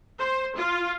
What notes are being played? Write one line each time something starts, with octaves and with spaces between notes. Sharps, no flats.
C5
F4